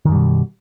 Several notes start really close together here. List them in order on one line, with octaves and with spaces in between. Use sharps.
D#3 F#2 G3 B2